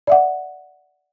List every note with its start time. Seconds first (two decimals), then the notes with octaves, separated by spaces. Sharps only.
0.07 D5 E5 F#5